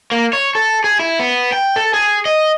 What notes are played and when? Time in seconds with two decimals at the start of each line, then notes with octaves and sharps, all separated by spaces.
0.12 A#3
0.33 C#5
0.55 A4
0.84 G#4
0.99 E4
1.19 B3
1.52 G5
1.76 A4
1.94 G#4
2.25 D#5